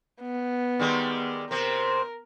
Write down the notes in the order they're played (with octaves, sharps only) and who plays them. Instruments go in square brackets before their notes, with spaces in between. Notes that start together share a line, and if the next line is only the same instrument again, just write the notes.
[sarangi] B3
[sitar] D#3 G3 G#3
[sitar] C3 C4 [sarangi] A#4